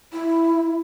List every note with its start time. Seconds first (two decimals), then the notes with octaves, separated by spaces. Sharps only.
0.13 E4